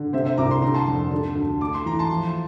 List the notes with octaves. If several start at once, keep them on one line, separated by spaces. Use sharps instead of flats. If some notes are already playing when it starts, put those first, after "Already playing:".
Already playing: D3
C3 C5 E5
C5 E5
C2 A#5 D6
C6
D3 A#5
A5 C6
F2
D3
D2
A3 D6
C6
E3 A#5
A5 C6
F3